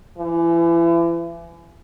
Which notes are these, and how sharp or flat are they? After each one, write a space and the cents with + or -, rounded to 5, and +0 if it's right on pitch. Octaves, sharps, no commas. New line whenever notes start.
E3 +35